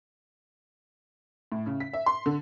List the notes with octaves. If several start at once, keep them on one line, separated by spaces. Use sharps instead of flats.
A2
C#3
B6
E5
C6
D3